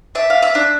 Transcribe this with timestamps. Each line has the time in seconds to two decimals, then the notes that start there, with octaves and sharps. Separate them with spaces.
0.15 D4 E5
0.30 F5
0.42 E5
0.55 D4